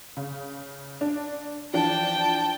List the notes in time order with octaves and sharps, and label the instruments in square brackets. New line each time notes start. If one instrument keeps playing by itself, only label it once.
[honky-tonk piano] C#3
D4
[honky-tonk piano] E3 F3 D4 [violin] G5 A5